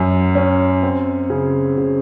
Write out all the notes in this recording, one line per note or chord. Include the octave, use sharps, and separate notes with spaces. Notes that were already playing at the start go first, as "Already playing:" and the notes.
Already playing: F#2 C#4
C#4
C4
C#3
C#3